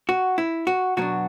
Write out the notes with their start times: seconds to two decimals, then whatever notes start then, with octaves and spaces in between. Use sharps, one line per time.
0.09 F#4
0.38 E4
0.67 F#4
0.97 B2 F#3 B3 D4 F#4